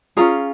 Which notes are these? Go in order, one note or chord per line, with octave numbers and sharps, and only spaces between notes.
C#4 F4 G#4 A#5